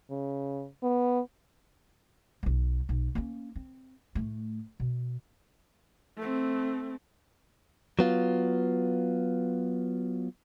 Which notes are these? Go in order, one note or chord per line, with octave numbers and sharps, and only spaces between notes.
C#3
B3
B1 F#3
B1
A#3 C#4
C4
A2 A3
B2
A3 C4
F#3 B3 F4